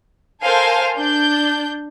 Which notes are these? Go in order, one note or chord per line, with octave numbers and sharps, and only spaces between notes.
A4 A#4 C5 F5 G#5 A5
D4 G6